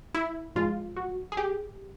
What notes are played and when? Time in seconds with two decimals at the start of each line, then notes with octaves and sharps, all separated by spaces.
0.14 E4
0.55 G#2 F3 G#3 F4
0.96 F#4
1.32 G#4
1.37 G4